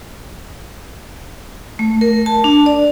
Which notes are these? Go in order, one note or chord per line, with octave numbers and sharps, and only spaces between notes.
A3
A#4
A5
D4
D5